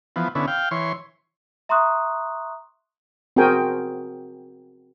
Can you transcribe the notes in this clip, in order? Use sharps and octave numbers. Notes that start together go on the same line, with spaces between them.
E3 F3 B3
D3 B3 C#4 E4
F5 G5
E3 C#5 C6
E5 A#5 C6 C#6 D#6 F#6
C4 F#4 G#4 A#4 G5 G#5